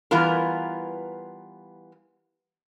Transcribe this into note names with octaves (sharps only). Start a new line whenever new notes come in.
E3 G3 B3 F4 A#4